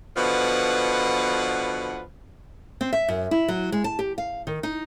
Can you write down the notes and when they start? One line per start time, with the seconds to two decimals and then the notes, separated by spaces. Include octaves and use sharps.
0.16 B2 D3 F3 B4 F#5
2.81 C4
2.93 E5
3.08 F#2
3.31 E4
3.48 F#3
3.72 G#3
3.84 A5
3.99 G4
4.18 F5
4.47 D#3
4.63 D#4